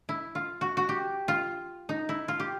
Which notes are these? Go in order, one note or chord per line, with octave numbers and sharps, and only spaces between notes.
E4
F4
F#4
F#4
G4
F4
D#4
E4
F4
G4